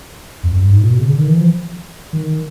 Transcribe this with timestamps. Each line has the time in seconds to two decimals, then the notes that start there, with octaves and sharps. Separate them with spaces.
0.43 F2
0.52 F#2
0.62 G2
0.72 G#2
0.81 A#2
0.90 B2
0.99 C#3
1.09 D3
1.18 D#3
1.28 E3
1.38 F3
2.13 D#3